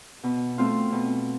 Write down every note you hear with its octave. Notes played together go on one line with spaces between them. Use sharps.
B2
A3 C4 F4
B2